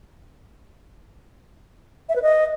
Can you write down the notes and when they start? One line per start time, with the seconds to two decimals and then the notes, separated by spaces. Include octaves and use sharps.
2.09 E5
2.16 B4
2.22 D#5